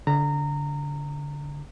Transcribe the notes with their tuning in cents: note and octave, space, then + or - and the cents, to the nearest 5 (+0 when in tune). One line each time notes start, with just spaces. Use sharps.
D3 -25 A#5 -20